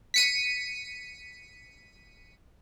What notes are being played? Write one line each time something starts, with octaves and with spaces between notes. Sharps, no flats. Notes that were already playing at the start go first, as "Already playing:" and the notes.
B6 C#7 D#7